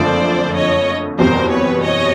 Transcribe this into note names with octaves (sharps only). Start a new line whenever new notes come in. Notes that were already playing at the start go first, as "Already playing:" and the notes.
Already playing: F#1 F2 D3 F3 A3 C5 D5
C#5 D#5
F#1 E2 B2 G3 C4 A#4 C5
B4 C#5
C#5 D#5